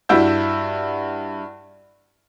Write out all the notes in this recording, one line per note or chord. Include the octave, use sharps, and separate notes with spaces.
G2 E4 F#4 E5 E6 G6